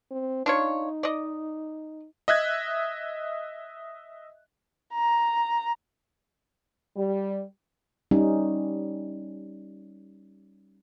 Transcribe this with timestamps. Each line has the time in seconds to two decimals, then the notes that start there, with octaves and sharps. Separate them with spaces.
0.11 C4
0.46 D4 D#4 F4 C#5
1.03 D5 D#5
2.28 D#5 E5 F#6 G#6
4.94 A#5
6.95 G3
8.11 G3 C#4 D#4